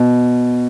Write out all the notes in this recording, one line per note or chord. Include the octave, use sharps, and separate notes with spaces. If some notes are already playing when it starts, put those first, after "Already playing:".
Already playing: B2